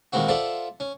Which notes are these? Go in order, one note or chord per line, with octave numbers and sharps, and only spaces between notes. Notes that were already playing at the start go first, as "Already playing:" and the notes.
D#2 A#2 G#3 B3 C4 F#4
F4 A4 C5 D5 E5 F#5
C#4